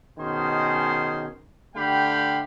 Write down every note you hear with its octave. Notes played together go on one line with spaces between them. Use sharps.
B2 D#3 C#4 G#4 C5 C6
D3 A3 G4 F5 G5 B5